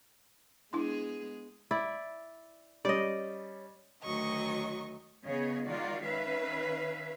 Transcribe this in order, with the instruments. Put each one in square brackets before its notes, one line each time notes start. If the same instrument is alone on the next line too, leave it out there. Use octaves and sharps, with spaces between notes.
[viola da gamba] G#3 B3 G#4 [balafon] D4 E4 C6
[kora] E4 D5
[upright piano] G3 C#4 [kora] D5 D#5
[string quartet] D2 D#3 F#3 D#5 C#6
[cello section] C#3 B3 G#4 C#5 D#5
D#3 G#3 D#4 F4 F#4 D5
D#3 C#4 B4 E5 F5